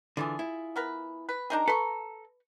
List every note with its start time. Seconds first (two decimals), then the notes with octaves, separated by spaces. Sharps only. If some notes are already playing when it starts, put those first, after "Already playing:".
0.17 D3 E3 F4 G#4
0.39 E4
0.76 B3 A#4 B4
1.29 B4
1.50 D4 D#4 G#4 A#4 A#5
1.68 A4 B4 C6 C#6